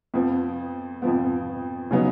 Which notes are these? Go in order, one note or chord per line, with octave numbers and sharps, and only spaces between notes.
F2 F3 B3
F2 F3 B3
C#3 F#3 B3 D#4